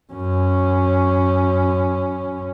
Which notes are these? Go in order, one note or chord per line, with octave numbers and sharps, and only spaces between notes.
F#2 C#4